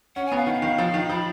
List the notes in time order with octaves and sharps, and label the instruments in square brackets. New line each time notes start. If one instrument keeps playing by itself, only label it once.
[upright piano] C#4 [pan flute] F#5
[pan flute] G#5
[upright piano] B3 [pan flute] F5
[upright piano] D#3 [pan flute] F#5
[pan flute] F5
[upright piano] D#3
F3
D#3
[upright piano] F3 [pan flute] B5